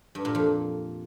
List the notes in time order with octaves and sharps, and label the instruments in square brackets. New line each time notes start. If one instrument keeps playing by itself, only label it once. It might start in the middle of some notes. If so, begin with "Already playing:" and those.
[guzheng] G2
A#2
F2